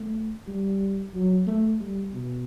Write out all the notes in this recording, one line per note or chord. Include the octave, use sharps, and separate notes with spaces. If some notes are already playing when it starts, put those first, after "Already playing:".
Already playing: A3
G3
F#3
A3
G3
B2